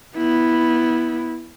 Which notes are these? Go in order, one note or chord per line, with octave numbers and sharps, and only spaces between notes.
B3 E4